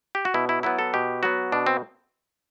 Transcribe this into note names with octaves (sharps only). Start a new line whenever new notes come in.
G4
F#4
B2 E4
E4
F#3 B3 E4
A4
B2 G4
F#3 B3 F#4
B2 D4
C4